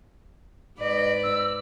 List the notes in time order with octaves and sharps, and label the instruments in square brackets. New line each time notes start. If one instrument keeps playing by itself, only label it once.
[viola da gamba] G#2 B4 D5 [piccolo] D#5
[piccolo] E6